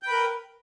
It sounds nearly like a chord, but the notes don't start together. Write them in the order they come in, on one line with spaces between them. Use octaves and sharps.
G5 B4 A#4